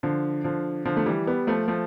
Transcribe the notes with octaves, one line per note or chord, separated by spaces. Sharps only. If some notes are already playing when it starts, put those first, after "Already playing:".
D3 F3
D3 F3
D3 F3
A3
E3 G3
G3 B3
F3 A3
F3 A3